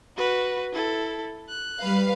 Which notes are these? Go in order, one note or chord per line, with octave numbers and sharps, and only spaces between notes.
F#4 B4
E4 A4
F#6
G3 B4 F5